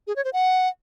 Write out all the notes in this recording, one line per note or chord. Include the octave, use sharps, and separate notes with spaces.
G#4
C#5
C5
F#5